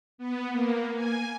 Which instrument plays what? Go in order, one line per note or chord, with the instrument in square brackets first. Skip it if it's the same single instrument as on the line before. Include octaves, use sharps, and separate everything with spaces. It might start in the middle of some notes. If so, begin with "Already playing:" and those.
[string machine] B3
A#3
G#5